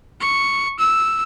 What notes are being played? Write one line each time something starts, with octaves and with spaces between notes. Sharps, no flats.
C#6
E6